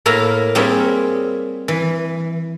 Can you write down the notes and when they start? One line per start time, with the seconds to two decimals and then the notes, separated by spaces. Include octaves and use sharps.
0.06 A2 A#3 E4 F5 A#5
0.55 G3 A#3 C4 G#4 C#5 E5
1.68 E3